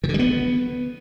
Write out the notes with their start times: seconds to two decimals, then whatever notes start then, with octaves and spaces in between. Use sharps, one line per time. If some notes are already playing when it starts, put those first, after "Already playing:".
0.04 D#3
0.09 D3
0.14 G3
0.19 B3